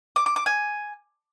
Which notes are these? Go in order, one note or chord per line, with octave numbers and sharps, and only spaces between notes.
D6
D6
D6
G#5